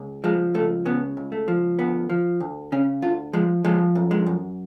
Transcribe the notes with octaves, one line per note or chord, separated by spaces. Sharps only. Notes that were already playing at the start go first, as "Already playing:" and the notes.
Already playing: C#2
F3 G#3
C#2 A3
C#3 B3
C#2
A3
F3
D2 B3
F3
D2
C#3 C#4
D2 F4
F3 G#3
F3 G#3
F#2
G#3
F#2